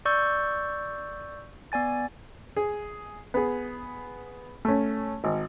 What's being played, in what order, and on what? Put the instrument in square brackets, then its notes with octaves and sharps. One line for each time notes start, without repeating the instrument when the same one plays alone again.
[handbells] D5 C#6 E6 G6
B3 D5 G#5 A6
[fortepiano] G#4
B3 G#4
A3 C#4
G#1